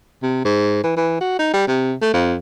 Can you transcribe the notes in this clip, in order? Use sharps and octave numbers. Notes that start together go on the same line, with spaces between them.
C3
G#2
E3
E3
F#4
D#4
G3
C3
A3
F2